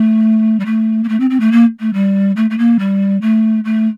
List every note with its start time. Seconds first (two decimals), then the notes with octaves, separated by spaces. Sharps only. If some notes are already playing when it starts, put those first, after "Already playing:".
Already playing: A3
0.60 G3
0.65 A3
1.04 A#3
1.08 A3
1.20 C4
1.30 C4
1.40 A3
1.52 A#3
1.80 A3
1.93 G3
2.36 A3
2.50 A3
2.58 A#3
2.79 G3
3.21 A3
3.65 A3